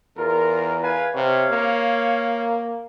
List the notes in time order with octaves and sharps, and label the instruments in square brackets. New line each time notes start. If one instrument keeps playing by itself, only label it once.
[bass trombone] E2 [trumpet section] F4 A#4
[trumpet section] B4 F5 G#5
[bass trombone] C3 [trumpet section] C#5 F5
[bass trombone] A#3